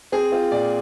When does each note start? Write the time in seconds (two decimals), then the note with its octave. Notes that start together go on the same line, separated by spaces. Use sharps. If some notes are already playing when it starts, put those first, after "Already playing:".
0.12 C4 G#4
0.32 C4 F4
0.51 A#2 D5